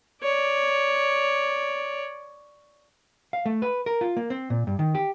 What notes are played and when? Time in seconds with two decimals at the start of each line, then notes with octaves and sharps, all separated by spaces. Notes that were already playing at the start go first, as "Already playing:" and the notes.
0.22 C#5 D5
3.33 F5
3.46 A3
3.62 B4
3.86 A#4
4.01 F4
4.17 A#3
4.30 C4
4.50 A#2
4.67 G2
4.79 D#3
4.95 G4